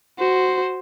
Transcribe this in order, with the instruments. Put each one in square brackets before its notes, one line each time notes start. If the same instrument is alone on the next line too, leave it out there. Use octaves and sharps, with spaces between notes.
[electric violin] F#4 C5